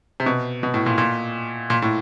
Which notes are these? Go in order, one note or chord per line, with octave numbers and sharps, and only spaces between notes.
C3
B2
B2
A2
A#2
A#2
A#2
A2